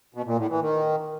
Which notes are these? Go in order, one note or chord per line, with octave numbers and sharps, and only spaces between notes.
B2
A#2
A2
E3
D#3